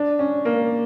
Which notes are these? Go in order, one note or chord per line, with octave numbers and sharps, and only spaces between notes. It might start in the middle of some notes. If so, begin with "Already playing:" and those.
Already playing: D4
C#4
A#3